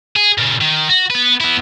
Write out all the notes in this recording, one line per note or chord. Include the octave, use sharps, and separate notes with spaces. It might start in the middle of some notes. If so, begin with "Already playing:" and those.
G#4
A#2 C#3
D#3
F#4
B3 B4
B3 E4